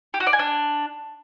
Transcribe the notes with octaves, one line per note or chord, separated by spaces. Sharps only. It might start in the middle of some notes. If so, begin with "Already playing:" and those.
G4
F#4
D5
G#5
D4